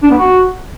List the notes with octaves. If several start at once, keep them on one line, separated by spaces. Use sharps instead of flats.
D4
B3
F#4